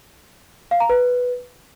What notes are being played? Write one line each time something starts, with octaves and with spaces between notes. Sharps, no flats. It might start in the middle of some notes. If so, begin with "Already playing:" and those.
F5
A#5
B4